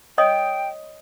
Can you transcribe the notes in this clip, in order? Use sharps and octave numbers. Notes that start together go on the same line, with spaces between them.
C#5 D#5 G5 D#6